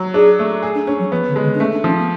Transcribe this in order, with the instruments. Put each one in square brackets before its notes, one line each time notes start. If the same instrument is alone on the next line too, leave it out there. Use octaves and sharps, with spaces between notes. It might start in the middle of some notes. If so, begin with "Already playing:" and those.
Already playing: [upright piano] F#3
[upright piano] D4 [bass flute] G#4
[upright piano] A3
G#4
[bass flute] D4
[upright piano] C#4 [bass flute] D4
[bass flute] F#3
[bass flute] F3 [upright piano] B3
[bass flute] D3
[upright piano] G#3
[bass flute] D3
D4
[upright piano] A3 [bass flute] C#4
[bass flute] D4
[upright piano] F3 [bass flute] C#4
[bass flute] B3